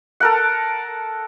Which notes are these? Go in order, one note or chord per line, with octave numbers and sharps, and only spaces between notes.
A4 A#4 F#5